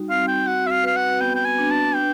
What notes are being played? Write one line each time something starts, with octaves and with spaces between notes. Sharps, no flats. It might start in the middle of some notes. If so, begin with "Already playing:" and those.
Already playing: G3 D#4 F#4
C4 F5
G5
F#4 F#5
E5
F5
B4 F5
F#5
B3 G5
G5
G#5
D4
A5
B4 G5